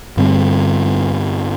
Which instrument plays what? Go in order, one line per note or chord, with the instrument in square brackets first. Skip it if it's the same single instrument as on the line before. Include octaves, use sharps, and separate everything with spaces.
[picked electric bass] G2 D3 G3 C4